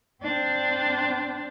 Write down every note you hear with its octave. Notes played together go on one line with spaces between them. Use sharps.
C4 D4